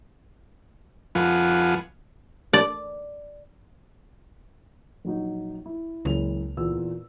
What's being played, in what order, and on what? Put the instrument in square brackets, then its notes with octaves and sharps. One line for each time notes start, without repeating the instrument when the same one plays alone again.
[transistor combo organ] F2 F3 F4 B4 F#5 G#5
[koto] D5
[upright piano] A#1 F#3 D#4
E4
[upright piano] F#1 E3 F7 [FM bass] C#2
[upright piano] E2 A#2 E6